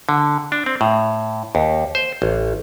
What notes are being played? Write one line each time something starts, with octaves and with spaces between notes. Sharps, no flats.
D3
D4
C4
A2
D#2
C5
A1